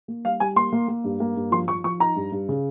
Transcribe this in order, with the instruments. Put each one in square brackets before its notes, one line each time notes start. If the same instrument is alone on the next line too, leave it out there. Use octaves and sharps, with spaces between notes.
[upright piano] A#3
G3 F5
G3 G#5
A#3 C6
A#3
A#3
G2
A#3
G2
F3 C6
F3 C#6
F3 C#6
D#4 A#5
G2
G2
C#3